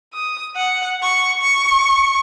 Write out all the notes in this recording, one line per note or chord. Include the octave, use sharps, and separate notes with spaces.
D#6
F#5
C#6
C#6